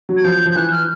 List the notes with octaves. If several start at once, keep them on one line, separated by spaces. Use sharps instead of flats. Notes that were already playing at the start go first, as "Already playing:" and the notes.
F#3
G#6
F3 G6
F3 G6
E3 F#6
F6